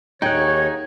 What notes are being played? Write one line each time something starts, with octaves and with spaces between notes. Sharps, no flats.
D#2 D#4 G#4 C#5 F#5 G5 G#6